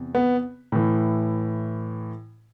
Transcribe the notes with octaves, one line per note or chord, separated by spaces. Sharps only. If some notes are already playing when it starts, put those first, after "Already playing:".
Already playing: E2 C3
B3
A2 E3